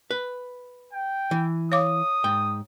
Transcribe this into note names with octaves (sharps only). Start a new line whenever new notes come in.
B4
G5
E3
C#5 F5 D6 D#6
G#2 G5